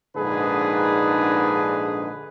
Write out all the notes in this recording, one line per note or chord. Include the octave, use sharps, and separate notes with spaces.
A#1 G#2 D3 D#4 G#4 B4